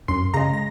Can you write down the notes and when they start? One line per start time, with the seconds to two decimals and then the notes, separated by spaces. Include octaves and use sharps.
0.08 F#2 C6 C7
0.34 C#3 G#3 A#5 A#6
0.54 A#6